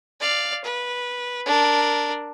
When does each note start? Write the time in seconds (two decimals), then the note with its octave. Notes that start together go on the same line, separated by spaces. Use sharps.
0.21 D5 F5
0.64 B4
1.47 D4 A#4